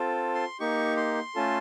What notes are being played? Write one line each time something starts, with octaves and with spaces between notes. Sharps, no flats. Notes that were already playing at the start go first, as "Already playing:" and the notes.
Already playing: C4 F4 A4
C6
A#3 D#4 G4 C#6
C6
A3 C#4 F4 A4